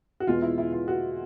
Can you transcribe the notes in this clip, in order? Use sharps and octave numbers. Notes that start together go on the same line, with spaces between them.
F#4
E2 B2 G#3 B3 F4
E4
E4
F4
F#4